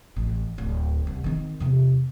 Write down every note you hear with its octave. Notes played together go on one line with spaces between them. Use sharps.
A1
D1 F4
C2
D#3 C4
E2 C3